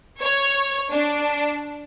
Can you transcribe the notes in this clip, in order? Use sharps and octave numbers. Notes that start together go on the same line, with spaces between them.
C#5
D4